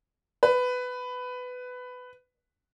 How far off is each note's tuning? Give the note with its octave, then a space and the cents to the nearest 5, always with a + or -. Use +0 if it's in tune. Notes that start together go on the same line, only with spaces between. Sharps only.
B4 +15